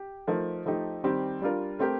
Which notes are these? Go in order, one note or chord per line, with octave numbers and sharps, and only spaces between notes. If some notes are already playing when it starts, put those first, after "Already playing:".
Already playing: G4
F3 A3 D#4 A#4
F3 A3 D#4 G4
D#3 G3 C4 G4
G3 D4 F4 A#4
A3 C4 G4 A#4